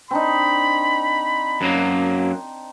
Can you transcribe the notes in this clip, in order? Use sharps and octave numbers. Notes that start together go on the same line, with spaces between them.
C4 D4 D#4 B5
F#2 F#3 A#3